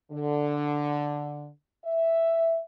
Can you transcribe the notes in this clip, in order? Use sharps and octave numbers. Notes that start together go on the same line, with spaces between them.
D3
E5